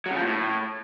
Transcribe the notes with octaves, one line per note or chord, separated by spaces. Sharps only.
F#3
C#3
F3
A#2
A2